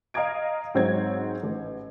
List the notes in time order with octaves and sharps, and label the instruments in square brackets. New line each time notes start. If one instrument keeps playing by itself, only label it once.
[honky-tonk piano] D#5 F5 A#5 D#6 G#6 D7
G#2 F#3 C4 D#4 C#5 G#6
A1